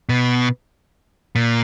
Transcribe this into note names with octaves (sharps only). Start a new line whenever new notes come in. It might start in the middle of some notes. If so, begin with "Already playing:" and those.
B2
A#2